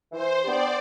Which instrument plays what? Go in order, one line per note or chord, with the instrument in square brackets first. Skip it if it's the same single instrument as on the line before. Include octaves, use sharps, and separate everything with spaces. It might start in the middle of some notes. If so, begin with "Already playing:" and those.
[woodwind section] E3 [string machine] C5
[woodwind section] B3 D4 G4 [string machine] D5